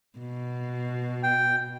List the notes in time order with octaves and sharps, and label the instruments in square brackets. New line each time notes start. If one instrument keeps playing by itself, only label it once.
[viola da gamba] B2
[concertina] G5